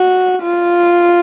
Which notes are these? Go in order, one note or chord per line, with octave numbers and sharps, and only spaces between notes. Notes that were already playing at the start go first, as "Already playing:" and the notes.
Already playing: F#4
F4